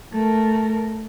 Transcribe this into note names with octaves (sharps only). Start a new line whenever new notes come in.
A3 A#4